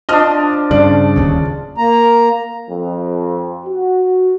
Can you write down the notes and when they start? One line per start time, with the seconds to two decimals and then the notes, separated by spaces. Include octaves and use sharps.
0.09 F3 D4 D#5 D#6 F6
0.71 G2 C#3 D5
1.16 D1 D#2 C#3
1.78 A#3 A#5
2.70 F2
3.67 F#4